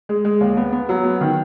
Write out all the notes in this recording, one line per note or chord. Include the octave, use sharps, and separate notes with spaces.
G#3
G#3
D#2
B3
B3
F#3
B3
D#3